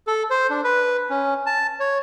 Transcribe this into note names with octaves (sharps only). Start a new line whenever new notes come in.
A4
C5
D4
B4
C#4
A5
C#5